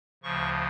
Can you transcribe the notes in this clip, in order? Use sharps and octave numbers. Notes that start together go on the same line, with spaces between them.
D2 C#3 F3 C#6